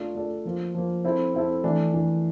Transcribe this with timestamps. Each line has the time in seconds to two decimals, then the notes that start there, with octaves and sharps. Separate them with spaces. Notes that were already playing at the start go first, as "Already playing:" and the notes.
Already playing: A3 D4 F4 A4 D5
0.15 A3 D4 F4 A4 D5
0.45 F3 A#3 F4
0.75 F3 A#3 F4
1.05 C4 E4 A4
1.35 C4 E4 A4
1.64 E3 A3 D4
1.94 E3 A3 D4